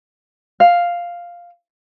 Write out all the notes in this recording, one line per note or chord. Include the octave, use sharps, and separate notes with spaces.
F5